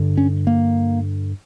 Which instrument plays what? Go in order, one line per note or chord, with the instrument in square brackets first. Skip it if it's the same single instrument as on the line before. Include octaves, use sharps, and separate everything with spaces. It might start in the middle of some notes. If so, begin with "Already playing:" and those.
Already playing: [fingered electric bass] G2 D3
C#4
A#3